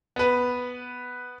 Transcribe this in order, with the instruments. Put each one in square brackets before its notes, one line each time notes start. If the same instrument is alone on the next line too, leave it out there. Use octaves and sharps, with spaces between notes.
[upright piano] B3 B4